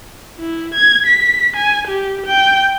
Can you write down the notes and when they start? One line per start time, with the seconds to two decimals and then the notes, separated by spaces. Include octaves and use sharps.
0.40 E4
0.74 G#6
1.06 B6
1.57 G#5
1.88 G4
2.26 G5